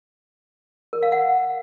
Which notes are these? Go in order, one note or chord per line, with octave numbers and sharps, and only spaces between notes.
A#4
F5
F#5